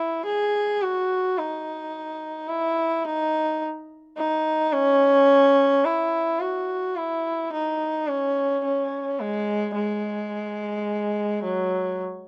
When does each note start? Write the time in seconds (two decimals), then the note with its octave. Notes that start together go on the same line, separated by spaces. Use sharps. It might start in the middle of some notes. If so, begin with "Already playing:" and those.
Already playing: E4
0.25 G#4
0.82 F#4
1.38 D#4
2.48 E4
3.05 D#4
4.17 D#4
4.72 C#4
5.84 E4
6.39 F#4
6.96 E4
7.52 D#4
8.08 C#4
8.64 C#4
9.20 G#3
9.75 G#3
11.43 F#3